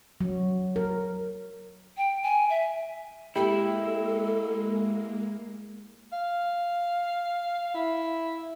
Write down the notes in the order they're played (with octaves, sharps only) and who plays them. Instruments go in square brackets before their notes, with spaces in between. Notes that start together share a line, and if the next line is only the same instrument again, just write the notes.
[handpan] F#3
A#4
[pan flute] G5
G#5
E5
[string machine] G#3 A#3 [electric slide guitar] E4 [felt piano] G4 [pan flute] A4
[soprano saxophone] F5
E4